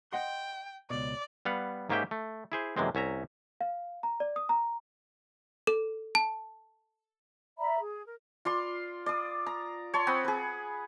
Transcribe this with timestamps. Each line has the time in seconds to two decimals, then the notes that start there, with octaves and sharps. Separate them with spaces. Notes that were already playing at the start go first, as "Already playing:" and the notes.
0.13 D#5 F#5 G5 C6
0.90 C#2 B2 D5
1.45 G3 B3 F5 F#5
1.90 G#2 A#3 C#4 G4 E5 G5
2.11 A3
2.52 E4 G#4 C5
2.77 F#2 C3 E3 G#3 C4
2.95 C2 C#4 E5 A#5
3.61 F5
4.03 A#5
4.20 D5
4.36 D#6
4.49 A#5
5.67 A4
6.15 A5
7.59 D5 E5 A#5 B5
7.80 G#4
8.06 A#4
8.45 F4 D5 C6
9.06 D5 D#6
9.47 A#5
9.94 C#5 A5 C6
10.07 C4 F#5 B5 D#6
10.25 G#4 B4